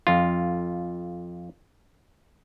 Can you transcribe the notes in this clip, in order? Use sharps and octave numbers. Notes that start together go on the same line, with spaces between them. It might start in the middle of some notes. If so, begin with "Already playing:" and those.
F2 F4